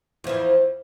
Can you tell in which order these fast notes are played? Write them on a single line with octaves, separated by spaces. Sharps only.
E2 F3 E3